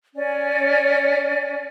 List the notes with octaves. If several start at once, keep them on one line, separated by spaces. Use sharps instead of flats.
C#4 D5 G#5